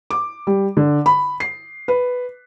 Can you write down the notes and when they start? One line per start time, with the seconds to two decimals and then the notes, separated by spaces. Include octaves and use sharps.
0.11 D6
0.47 G3
0.77 D3
1.06 B5
1.40 C7
1.88 B4